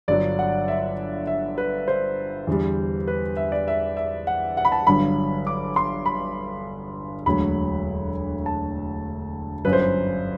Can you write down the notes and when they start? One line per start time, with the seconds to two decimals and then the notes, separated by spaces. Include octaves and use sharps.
0.08 G1 G2 D3 F#3 D5
0.39 F#5
0.68 E5
1.27 E5
1.58 B4
1.88 C5
2.47 E2 D3 G3
3.08 B4
3.37 E5
3.52 D5
3.68 E5
3.97 E5
4.27 F#5
4.57 F#5
4.65 B5
4.72 A5
4.87 G1 G2 D3 F#3 B5
5.47 D6
5.76 C6
6.06 B5
7.26 E1 D2 D3 F#3 B5
8.46 A5
9.65 G1 F#2 F#3 B4
9.73 C5
9.81 B4